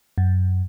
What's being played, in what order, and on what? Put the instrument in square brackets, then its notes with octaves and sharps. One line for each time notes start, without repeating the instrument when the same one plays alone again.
[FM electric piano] F#2